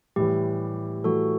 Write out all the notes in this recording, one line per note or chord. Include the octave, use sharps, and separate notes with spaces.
A2 E3 G3 G4
A2 E3 G3 F#4 A4